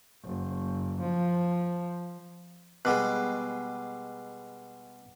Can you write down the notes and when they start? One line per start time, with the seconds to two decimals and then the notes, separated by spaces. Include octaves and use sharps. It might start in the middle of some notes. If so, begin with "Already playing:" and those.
0.24 F#1
1.01 F3
2.85 B2 G3 G#3 F#5 D6 F#6